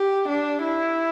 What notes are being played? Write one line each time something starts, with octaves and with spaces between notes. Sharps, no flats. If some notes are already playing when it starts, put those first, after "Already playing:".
Already playing: G4
D4
E4